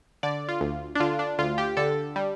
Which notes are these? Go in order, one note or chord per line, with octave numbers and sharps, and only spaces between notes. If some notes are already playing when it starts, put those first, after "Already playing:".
D3 D5
F4
D2
D4
D3 F4
D4
D2 F4
G4
D3 A4
G3